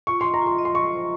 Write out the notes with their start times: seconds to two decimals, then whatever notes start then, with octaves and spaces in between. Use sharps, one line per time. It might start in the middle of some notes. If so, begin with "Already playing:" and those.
0.07 F4 C#6
0.21 D#5 C6
0.34 A#5
0.41 F4
0.47 C6
0.58 D#5
0.65 C6
0.75 F4 C#6
0.92 C5